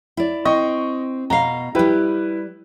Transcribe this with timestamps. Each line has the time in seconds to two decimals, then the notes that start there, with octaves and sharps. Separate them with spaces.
0.17 E4 D5
0.45 C4 D#5 C#6
1.30 B2 F5 A#5
1.75 G3 E4 G4 B4